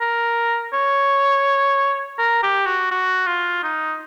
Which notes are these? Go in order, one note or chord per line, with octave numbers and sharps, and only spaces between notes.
A#4
C#5
A#4
G4
F#4
F#4
F4
D#4